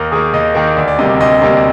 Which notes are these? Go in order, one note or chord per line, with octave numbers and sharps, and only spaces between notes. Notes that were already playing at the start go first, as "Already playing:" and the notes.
Already playing: D#2 A#4
D#3 A#3 G#4
D#2 D#5
D#3 A#3
D2 D5
D5
C3 G3 A#3 D#5
D5
D2 D#5
C3 G3 A#3